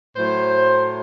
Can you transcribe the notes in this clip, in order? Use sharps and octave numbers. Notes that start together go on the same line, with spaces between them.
A2 F#3 C5